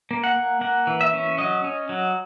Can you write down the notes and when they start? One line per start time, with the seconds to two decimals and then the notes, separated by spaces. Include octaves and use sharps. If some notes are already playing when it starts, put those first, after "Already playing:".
0.11 A#3
0.24 F#5
0.36 A#3
0.61 A#3 F#5
0.87 E3
1.01 E5
1.14 C#4
1.38 F#3 D#5
1.64 C#4
1.89 F#3